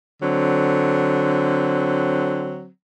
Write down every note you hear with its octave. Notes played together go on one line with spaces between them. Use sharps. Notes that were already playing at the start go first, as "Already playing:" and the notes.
D3 F#3 C4